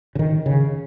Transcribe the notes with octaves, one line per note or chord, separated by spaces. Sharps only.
C#3
D#3
C#3